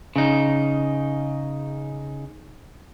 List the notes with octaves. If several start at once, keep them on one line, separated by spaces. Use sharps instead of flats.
C#3 D#4